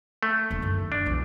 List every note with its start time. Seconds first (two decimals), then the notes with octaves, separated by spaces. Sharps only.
0.23 A3
0.50 E1 D4
0.62 F#2 D#3
0.92 D4
1.06 B1 E2